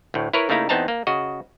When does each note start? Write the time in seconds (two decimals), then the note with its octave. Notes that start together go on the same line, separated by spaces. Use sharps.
0.14 D2 A2
0.33 E4 A#4 B4 C#5
0.49 C#3 A3 A#3 D#4 E4 A#5
0.69 E2 B3 C4 D#4 A5 A#5
0.88 A#3
1.07 C#3 F#4 D#5